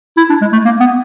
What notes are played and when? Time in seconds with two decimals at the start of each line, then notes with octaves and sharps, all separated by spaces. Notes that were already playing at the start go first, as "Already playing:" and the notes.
0.17 E4
0.30 D4
0.41 G#3
0.53 A3
0.65 A#3
0.80 B3